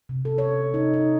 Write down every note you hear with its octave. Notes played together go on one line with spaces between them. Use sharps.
C3
A4
C#5
D#4
D#4